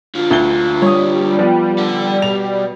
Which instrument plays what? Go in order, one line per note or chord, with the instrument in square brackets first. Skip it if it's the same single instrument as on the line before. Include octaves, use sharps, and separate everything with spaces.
[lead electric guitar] D3 F4
[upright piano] D2 G7
[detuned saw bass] G3 [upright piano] C#5 D#6
[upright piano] F3 B3
[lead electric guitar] A4 F#5
[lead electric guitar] B2 [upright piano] F7